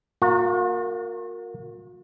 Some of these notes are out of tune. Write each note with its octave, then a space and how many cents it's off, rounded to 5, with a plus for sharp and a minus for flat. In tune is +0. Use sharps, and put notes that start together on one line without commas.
A#3 -15 F#4 -45